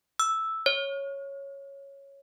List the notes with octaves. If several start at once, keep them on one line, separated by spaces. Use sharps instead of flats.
E6
C#5